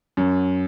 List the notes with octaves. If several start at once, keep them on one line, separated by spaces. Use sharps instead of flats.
F#2